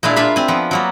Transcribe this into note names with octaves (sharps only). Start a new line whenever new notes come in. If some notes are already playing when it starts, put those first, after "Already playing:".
A#2 G#3 D4 E4 F5
D4 F4 E5 F5 B5
C4 G#5
F3 B3
F#3 A#3 B3